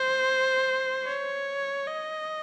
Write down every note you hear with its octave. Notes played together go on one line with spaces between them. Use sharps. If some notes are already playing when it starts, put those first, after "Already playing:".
Already playing: C5
C#5
D#5